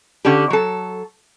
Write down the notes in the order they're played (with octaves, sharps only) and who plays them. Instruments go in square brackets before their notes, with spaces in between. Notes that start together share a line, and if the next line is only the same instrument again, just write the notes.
[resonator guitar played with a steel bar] D3 C#4 D4 G4
F#3 A4